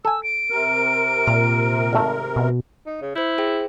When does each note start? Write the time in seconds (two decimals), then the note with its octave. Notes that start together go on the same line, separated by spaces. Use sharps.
0.05 A4 G#5 E6
0.23 D7
0.50 C3 A#4
1.27 A#2 A#5
1.93 G#1 A3
2.36 B2
2.86 D#4
3.01 C#3
3.15 E4 C5 G6
3.38 G#4 C5 G5